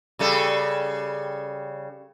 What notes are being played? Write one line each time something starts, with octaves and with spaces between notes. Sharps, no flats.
C#3 G3 A4